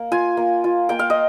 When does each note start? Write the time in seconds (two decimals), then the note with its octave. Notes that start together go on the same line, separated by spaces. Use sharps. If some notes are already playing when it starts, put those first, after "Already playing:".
Already playing: A#3
0.12 F4 G#5
0.37 A#3
0.64 F4
0.89 A#3 G5
0.99 F5
1.10 D#5